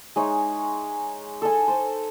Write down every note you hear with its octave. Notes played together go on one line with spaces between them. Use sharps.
G#3 D#4 C#5 E5
A4 G#5
C5